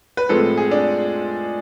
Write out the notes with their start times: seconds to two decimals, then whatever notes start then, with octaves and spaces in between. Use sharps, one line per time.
0.17 B4
0.29 A2 F3 G#3 C4 A4
0.57 G#4
0.71 D4